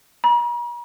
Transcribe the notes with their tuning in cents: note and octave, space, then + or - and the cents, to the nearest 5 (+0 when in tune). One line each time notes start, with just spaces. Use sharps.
A#5 +45